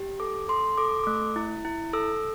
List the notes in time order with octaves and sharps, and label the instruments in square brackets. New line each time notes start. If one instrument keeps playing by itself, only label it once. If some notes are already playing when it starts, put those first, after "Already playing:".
Already playing: [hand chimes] G4
A4 D6
A4 C6
A4 D6
C6
A3 D6
E4
E4
A4 E6